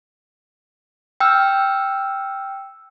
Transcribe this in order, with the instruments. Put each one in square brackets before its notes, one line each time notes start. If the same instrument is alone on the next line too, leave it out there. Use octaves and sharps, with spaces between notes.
[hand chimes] G5 E6 F6